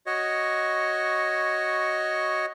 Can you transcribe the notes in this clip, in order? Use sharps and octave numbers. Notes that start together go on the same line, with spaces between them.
F#4 C#5 D#5